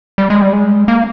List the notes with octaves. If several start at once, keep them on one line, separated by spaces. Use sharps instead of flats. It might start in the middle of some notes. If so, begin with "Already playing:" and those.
G3
G#3
G3
G#3
A#3